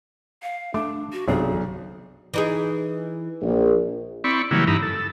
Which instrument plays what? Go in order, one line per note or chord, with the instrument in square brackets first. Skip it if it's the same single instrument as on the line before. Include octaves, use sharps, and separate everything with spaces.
[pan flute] F5
[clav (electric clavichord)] A3 [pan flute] D4 [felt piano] D6
[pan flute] F#4
[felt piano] B1 [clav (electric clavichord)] C3 F#3 D4 [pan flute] G#4
[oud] E3 D#4 G#4
[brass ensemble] A#1
[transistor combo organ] C4 E4 D5 B5 C#6
C#3 E3 F#3 G3 A#3 E4
G2 E3 D#4 E4 A#5 B5
A4